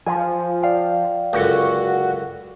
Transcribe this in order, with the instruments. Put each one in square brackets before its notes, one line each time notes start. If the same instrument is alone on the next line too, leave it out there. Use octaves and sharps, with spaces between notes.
[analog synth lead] F3 [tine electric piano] G#5
[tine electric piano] D5 F5 G5
[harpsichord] C#2 F#2 D3 [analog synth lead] F#4